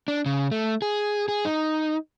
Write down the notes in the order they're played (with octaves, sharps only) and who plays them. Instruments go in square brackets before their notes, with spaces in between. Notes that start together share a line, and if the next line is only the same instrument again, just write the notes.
[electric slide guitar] D4
C#3
A3
G#4
G#4
D#4